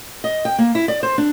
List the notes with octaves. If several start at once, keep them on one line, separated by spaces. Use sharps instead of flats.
D#5
G5
A#3
E4
D5
C5
D4